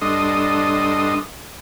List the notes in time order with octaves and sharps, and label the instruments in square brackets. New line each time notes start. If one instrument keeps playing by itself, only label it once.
[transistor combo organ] G2 D4 A4 D#5 C6 D#6